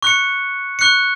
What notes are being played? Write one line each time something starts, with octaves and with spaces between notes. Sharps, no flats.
C#6 F#6 C#7
C#6 F#6 C#7